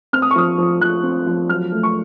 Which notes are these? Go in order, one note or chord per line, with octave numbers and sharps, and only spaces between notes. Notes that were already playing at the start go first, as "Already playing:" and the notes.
C4 F6
D#6
C#6
F3 D#6
F3
F3 F#6
C4
F3
F#3 F6
A3
C#6